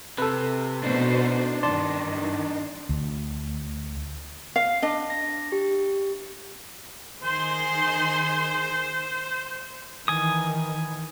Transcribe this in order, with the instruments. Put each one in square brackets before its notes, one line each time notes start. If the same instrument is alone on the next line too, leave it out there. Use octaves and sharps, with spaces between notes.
[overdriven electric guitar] C3 [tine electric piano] A4 B4
[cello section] B2 C5 [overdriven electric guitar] D4 D#4
[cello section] G2 D#3 [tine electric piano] D5 A5 C6
[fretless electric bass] D2
[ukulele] F5
D4 D#5
[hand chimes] A#6
G4
[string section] D#3 G#4 C6 [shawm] C5
[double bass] D#3 E3 [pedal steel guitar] G#5 D#6